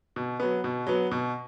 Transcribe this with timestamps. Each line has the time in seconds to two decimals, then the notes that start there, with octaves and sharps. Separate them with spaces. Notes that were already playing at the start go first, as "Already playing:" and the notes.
0.16 B2
0.40 F#3 B3
0.64 B2
0.87 F#3 B3
1.11 B2